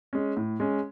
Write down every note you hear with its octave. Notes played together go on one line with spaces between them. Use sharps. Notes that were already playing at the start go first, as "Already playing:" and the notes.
G#3 C#4
A2
G#3 C#4